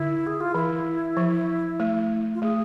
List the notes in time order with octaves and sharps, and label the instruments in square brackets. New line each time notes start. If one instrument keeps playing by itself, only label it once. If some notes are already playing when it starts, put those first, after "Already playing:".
Already playing: [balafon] D3 [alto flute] E4
[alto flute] G#4
F4
[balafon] E3 [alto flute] E4
[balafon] F3
A3
[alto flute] F4
[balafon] A3 [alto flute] G#4